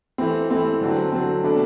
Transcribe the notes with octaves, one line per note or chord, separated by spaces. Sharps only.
E3 A3 C4
E3 A3 C4
D3 F#3 C4
D3 F#3 C4
B2 A3 D4